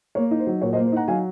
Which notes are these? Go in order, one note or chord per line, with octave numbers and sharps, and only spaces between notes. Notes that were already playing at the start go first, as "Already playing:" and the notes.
A#3 C#5
D#4
C5
F#3
A#2 C#5
C5 D#5
A#3
C5
D#4 F#5 A#5
F#3 F5 G#5